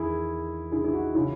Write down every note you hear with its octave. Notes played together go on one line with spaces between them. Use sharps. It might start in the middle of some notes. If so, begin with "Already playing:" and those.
Already playing: E2 D#3 E4 G#4
E4 G#4
E4
D#4 F#4
C#3 E3 C#4 E4